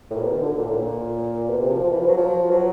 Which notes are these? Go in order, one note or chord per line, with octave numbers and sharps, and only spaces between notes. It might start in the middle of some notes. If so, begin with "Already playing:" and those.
A2
A#2
B2
D#3
D3
A#2
A2
A#2
B2
C3
F3
F3
E3
F3
F#3
F3
F#3